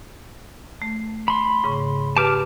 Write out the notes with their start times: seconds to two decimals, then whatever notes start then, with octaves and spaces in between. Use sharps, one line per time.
0.82 A3
1.28 B5 C6
1.64 G#2 C#3 C#6
2.17 G4 B4 A5 D6 F6